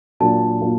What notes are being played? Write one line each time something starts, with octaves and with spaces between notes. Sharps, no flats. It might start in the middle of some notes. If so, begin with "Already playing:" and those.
A#2 F#3 A#3 D4 F4 A5
A#2 F#3 A#3 D4 F4